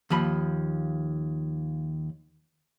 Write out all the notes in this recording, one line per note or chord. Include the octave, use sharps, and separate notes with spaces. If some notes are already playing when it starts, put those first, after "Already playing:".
D#2 F3 B5